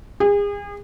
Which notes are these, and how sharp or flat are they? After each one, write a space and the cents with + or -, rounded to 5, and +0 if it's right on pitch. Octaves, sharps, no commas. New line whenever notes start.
G#4 -35